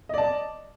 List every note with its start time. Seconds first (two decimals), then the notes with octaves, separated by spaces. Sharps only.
0.09 D#5
0.14 D5
0.18 A5